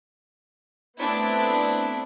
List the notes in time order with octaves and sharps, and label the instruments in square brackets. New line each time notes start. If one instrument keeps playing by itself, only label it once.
[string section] A3 B3 C4 D4 E4